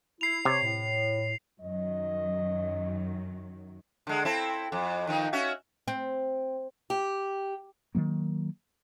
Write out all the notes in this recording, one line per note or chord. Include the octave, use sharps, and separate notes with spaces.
E4 C7 F7
C3 C#5
A2
F#2 D#3 F#3 D#5
D3 G#3
C4 E4 A4
F2
D#3 F3 D#4
C#4 F#4 E5
C4
G4
D#3 F3 F#3 A#3